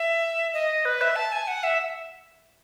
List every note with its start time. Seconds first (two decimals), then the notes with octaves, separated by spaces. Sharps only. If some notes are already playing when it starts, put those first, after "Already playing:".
Already playing: E5
0.54 D#5
0.85 B4
1.01 E5
1.16 A5
1.32 G#5
1.47 F#5
1.64 E5